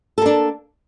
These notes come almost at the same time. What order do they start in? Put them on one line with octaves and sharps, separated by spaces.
A4 A#3 D4